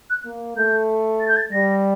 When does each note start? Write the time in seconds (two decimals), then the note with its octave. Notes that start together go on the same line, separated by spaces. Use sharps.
0.10 F#6
0.25 A#3
0.57 A3 G6
1.20 A6
1.28 G6
1.37 A6
1.51 G3 A#6